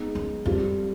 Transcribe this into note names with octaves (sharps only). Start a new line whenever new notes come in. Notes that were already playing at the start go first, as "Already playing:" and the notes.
Already playing: G#3 B3 D#4
F#2
F2 G3 C4 F4 A4